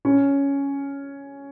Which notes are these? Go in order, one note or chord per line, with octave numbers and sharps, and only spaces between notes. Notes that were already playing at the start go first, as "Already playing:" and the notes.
C#4